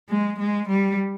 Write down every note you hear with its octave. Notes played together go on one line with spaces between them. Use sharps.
G#3
G#3
G3